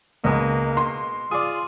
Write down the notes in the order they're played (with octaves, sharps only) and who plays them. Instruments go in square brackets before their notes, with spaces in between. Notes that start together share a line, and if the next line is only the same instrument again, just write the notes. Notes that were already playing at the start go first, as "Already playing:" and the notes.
[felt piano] C#2 [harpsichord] B2 G#3 [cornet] A#3
[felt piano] C6
[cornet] F4 [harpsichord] G#4 D5